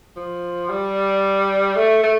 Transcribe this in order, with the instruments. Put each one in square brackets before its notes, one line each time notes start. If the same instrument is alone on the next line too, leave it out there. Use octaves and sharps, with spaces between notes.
[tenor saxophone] F3
G3
A3
A3